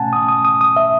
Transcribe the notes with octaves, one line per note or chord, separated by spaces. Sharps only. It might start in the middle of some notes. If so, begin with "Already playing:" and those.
Already playing: B2 A3 C#4 F#5 G#5 A5
D#6
D#6
D#6
D#6
E5